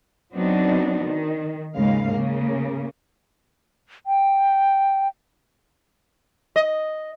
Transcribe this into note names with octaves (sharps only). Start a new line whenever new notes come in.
F#3 B3 C4 D4 D#4 F#4
D#3
D#2 G#2 C#3 G#3 F5
C#3 A#3
G5
D#5